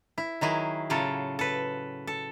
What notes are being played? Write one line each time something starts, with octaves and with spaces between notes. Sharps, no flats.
E4
D#3 F#3 E4 G#4
A2 C#3 F#3 F4 A4
A4 B4
A4